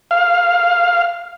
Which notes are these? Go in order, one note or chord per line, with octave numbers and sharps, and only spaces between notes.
F5